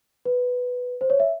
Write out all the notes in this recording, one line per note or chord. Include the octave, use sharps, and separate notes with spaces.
B4
C5
C#5
E5